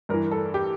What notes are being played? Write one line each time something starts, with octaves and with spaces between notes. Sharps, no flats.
G2 E3 A#4
A4
G4